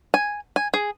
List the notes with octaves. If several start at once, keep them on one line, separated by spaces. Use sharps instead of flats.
G#5
G#5
G#4